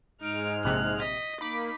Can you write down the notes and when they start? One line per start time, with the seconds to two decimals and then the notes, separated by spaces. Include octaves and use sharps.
0.21 G#2 G#3 D#4 F6 D7
0.65 A#1 C3 F#6
1.00 D#5 B6
1.41 A#3 D#4 B5 D6 B6